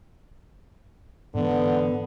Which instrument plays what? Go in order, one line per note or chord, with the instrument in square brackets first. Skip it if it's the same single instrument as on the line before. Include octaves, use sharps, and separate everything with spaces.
[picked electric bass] G#2 E3 [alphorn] D3 [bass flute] B3